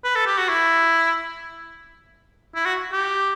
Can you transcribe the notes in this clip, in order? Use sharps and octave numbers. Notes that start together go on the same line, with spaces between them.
B4
A4
G4
F#4
E4
E4
F#4
G4